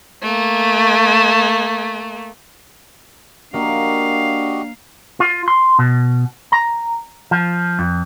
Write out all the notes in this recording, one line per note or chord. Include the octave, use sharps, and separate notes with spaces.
A3 A#3
A#3 D4 F#4 G4 D#5 F5
F4
C6
B2
A#5
F3
F2